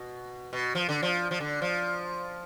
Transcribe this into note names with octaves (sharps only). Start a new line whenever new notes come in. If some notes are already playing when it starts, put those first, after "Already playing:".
Already playing: B2
B2
F3
D3
F3
F3
D3
F3